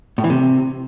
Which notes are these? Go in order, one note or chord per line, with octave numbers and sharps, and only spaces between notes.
A2
E3
C3